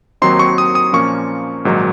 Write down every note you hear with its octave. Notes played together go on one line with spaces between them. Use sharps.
D#2 D#3 F#3 C4 D#4 C6
C#6
D#6
D#6
A#2 F3 A#3 C#4 F4 C#6
A#1 G#2 D#3 F#3